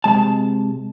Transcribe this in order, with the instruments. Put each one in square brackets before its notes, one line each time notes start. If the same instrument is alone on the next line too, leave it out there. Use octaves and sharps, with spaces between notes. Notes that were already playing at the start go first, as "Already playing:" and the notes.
[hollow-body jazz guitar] C3 G#3 A5